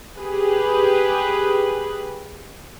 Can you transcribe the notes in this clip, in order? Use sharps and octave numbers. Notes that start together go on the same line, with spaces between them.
G4 G#4 B4